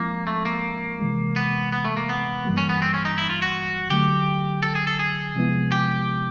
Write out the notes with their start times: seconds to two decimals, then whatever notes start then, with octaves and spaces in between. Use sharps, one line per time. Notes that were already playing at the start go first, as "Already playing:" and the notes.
Already playing: F3 G#3 A#3 C4 E4
0.27 A3
0.45 A#3
1.00 C3 E3 G#3
1.36 B3
1.72 B3
1.85 A3
1.97 A#3
2.09 B3
2.45 G2 E3 G3 A#3
2.58 C#4
2.69 B3
2.82 C4
2.94 C#4
3.05 D#4
3.18 E4
3.29 F4
3.42 F#4
3.90 D3 F#3 A3 G4
4.63 A4
4.75 G#4
4.87 A4
4.99 G#4
5.35 C3 F3 G#3 B3 E4
5.72 G4